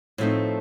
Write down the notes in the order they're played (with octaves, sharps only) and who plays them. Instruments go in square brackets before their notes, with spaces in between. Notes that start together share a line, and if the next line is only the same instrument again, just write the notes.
[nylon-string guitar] A2 F3 A3 C4 D#4